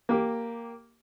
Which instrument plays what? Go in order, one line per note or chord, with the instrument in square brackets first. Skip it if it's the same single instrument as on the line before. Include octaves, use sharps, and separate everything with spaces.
[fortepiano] A#3 G4